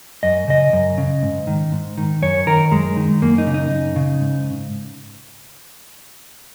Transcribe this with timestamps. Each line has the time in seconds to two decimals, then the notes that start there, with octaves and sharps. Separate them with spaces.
0.23 F#2 D#5
0.48 C#3 D#5
0.73 F#2
0.98 C#3
1.23 G#2
1.47 D#3
1.72 G#2
1.98 D#3
2.22 F#2 C#5
2.47 D#3 A#4
2.71 F#2 G#3
2.97 D#3
3.22 F#2 A#3
3.38 D#4
3.47 C#3
3.54 D#4
3.71 F#2
3.96 C#3
4.21 G#2